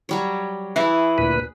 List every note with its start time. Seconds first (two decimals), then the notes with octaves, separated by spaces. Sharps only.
0.09 F#3 G3 C#5
0.76 E3 E4 G#4
1.18 D2 A#2 B4